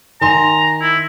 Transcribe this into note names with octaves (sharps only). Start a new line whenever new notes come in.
D#3 G#5 A#5 C6
E4